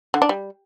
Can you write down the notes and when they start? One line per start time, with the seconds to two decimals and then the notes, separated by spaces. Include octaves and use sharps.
0.14 D3
0.22 D4
0.29 G3